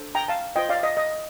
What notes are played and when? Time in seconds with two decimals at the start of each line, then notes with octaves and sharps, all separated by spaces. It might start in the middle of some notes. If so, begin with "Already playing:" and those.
Already playing: D4 A4 C5
0.15 G5 A#5
0.28 F5 A5
0.56 F4 C5 D#5 G5
0.69 D5 F5
0.83 D#5
0.97 D#5